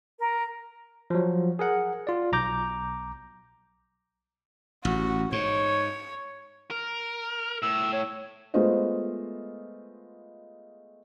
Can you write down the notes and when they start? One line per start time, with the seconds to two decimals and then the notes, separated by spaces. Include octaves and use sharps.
0.18 A#4
1.10 F3 F#3
1.59 G#4 A#4 F#5
2.07 F4 D5
2.32 B1 A#5 D6 G6
4.85 A1 F#4
5.32 G#2 C#5
6.71 A#4
7.62 A2 E6
7.93 C#5
8.54 G#3 A3 B3 F4 C5 D#5